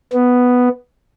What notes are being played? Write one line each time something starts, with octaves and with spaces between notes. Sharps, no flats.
B3